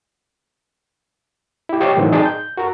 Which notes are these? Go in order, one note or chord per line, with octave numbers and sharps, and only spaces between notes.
E4 G4
F4 G4 C5 C#5 D#5 G5
A2 D#3 E3 F#3 C4
D#4 G#4 D5 G5 A5 C6
G6
F#4 A#4 A#5